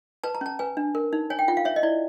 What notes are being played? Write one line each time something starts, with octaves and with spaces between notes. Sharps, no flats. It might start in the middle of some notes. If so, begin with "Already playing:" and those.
B4 A5
A#5
C#4 A5
B4 G#5
D4
A#4
D#4
C#5 G#5
G5
F4 F#5
F5
C#5 E5
D#5
E4 D5